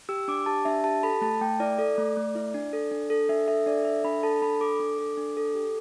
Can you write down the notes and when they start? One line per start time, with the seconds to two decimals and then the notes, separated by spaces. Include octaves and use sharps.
0.09 G4 E6
0.28 D4 D6
0.46 G4 A5
0.65 D4 E5
0.84 G4 A5
1.03 A4 B5
1.21 A3 A5
1.41 A3 G5
1.60 E4 D5
1.78 A4 D5
1.98 A3
2.17 A3
2.35 E4
2.54 D4
2.73 A4
2.91 D4
3.10 A4
3.29 D4 E5
3.48 A4 E5
3.66 D4 D5
3.85 A4 E5
4.04 D4 B5
4.23 A4 A5
4.42 D4 B5
4.61 A4 D6
4.80 D4
4.98 A4
5.17 D4
5.37 A4
5.55 G4